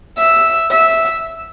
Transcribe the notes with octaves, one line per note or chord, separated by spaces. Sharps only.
E5
E5